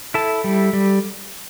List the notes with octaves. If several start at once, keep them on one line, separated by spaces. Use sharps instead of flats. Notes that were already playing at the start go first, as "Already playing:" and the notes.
E4 A4 A5
G3
G3